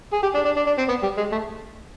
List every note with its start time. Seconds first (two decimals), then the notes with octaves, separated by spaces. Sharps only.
0.13 G#4
0.23 G4
0.35 D4
0.45 D4
0.56 D4
0.67 D4
0.78 C4
0.89 B3
1.03 G3
1.17 G#3
1.32 A3